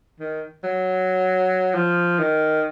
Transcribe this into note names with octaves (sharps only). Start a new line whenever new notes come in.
D#3
F#3
F3
D#3